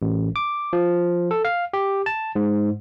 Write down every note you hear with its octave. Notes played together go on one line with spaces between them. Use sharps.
A1
D6
F3
A4
F5
G4
A5
G#2